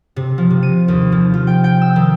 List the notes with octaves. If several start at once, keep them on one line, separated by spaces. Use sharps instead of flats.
C3
F3
C3
D#7
D#2
F3
F4
G5
G5
E6
D#3